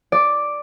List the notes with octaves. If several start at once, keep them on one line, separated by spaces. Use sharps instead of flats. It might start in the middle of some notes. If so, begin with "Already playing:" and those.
D5